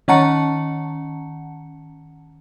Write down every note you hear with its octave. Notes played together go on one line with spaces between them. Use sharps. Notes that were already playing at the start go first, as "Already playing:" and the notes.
D#3 C#4 F#5 A5 A#5 C#7